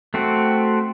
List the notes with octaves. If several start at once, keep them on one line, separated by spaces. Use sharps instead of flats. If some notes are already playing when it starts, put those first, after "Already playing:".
A3 C4 F#4